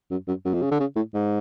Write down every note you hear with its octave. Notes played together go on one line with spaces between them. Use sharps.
F#2
F#2
F#2
F2
C#3
D3
C#3
A2
G#2